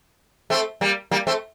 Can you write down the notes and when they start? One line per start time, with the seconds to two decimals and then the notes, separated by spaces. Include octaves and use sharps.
0.50 A3 C4
0.81 G3 A#3
1.11 G3 A#3
1.27 A3 C4